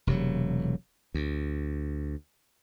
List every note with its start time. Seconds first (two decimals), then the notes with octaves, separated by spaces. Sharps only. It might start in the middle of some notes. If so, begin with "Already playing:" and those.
0.07 E1 C3 F#3
1.14 D2